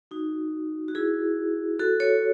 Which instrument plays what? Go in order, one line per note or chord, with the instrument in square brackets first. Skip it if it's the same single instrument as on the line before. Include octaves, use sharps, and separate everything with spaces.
[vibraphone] D#4 F#4
F#4
E4 G#4
F#4 A4
A4 C#5